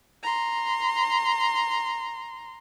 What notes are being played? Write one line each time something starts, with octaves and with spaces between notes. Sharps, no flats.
A#5 C6